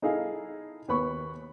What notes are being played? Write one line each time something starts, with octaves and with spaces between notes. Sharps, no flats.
D#4 E4 G#4 A4 F5
D#2 B4 B5 C#6